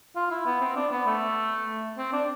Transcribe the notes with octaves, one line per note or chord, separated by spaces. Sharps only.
F4
E4
B3
C4
D4
B3
A3
C4
D4